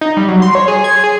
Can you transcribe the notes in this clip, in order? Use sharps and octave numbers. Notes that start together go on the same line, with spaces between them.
D#4
G3
F#3
C6
C#5
G#4
G#6
G#4